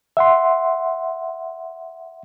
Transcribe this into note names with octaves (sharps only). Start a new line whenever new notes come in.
E5 F#5 C6